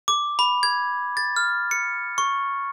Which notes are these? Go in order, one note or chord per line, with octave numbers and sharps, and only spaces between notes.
D6
B5
G#6
A6
F6
C#7
C#6